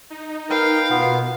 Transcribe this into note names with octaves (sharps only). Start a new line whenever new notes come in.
D#4
A#4 B4 F5 G5
B2 B3 F4